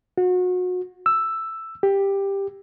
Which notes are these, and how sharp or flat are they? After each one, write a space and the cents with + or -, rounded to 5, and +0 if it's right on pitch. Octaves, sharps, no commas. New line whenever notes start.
F#4 -30
E6 +5
G4 +10